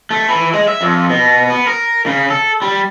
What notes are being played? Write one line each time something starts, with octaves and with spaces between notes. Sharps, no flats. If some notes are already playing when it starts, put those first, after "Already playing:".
A3
E3
G#3
E5
F2
B2
B3
A#4
C#3
A4
G3